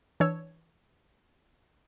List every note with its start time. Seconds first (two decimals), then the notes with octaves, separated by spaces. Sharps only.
0.20 E3 D4 C#5 E6